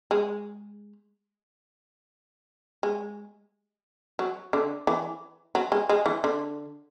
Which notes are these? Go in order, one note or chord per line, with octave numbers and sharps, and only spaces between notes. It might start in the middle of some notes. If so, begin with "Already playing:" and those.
G#3
G#3
F#3
D3
E3
F#3
G#3
G#3
E3
D3